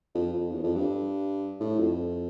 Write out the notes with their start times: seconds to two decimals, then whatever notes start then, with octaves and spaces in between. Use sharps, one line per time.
0.15 F2
0.33 F2
0.51 E2
0.63 F2
0.75 G2
1.60 A2
1.79 F2